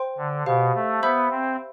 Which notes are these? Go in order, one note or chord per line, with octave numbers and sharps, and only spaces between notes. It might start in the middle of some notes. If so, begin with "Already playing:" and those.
Already playing: C5 G5 C6
D3
B2 G4 C5 F5
A3
B3 C5 E5 B5 E6 G6
C4